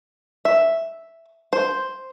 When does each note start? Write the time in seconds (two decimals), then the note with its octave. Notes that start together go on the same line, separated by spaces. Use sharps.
0.45 E5
1.53 C5